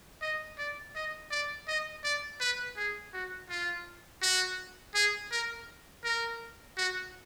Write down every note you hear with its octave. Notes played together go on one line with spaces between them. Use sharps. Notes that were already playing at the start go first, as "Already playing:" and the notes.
D#5
D5
D#5
D5
D#5
D5
B4
G#4
F#4
F4
F#4
G#4
A#4
A#4
F#4